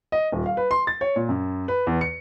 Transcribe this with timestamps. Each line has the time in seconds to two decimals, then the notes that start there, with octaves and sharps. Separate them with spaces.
0.12 D#5
0.32 D#1
0.46 F5
0.57 B4
0.71 C6
0.87 A6
1.01 C#5
1.16 A#2
1.29 F#2
1.68 B4
1.87 E2
2.01 C#7